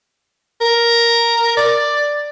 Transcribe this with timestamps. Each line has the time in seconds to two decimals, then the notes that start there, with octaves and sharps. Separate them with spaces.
0.61 A#4
1.57 D5